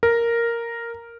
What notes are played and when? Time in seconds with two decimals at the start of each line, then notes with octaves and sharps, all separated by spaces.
0.03 A#4